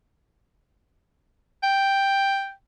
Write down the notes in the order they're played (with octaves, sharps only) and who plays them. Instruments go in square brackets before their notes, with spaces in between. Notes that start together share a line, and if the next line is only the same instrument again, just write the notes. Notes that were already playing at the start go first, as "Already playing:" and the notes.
[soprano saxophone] G5